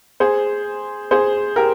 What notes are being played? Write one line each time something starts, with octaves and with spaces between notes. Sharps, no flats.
G#4 C5
G#4 C5
G4 A#4